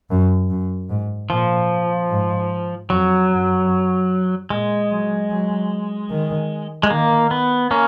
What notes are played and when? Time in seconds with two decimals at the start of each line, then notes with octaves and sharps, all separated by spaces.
0.10 F#2
0.50 F#2
0.90 G#2
1.30 A#2 F3
2.10 G#2
2.90 F2 F#3
3.30 F#2
4.50 A#2 G#3
4.90 F#3
5.30 F#3
6.10 D#3
6.83 G#3
6.90 D#3 A#3
7.31 B3
7.71 A#3 C#4